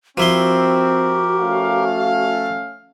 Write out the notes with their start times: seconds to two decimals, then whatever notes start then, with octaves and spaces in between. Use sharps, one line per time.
0.17 F3 C4 E4 F#4 G4 A#4 C6
1.40 A3 C#4 F5